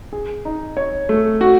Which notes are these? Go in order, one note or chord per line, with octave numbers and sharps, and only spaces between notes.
G#4
D#4
C#5
A3
F#4